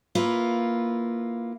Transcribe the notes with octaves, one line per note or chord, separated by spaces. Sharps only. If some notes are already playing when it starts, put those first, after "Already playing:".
A#3 E4 F4 B4